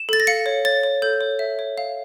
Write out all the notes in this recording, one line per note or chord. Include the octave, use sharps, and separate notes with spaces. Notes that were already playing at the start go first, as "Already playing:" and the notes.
Already playing: E7
A4 A6
A#6
F5 C#7
C#5
C#5 A6
C#5
A4 G6
C#5
E5
C#5
F5